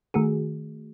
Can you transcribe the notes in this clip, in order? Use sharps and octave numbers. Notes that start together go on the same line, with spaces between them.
D#3 A3 F#4 G#4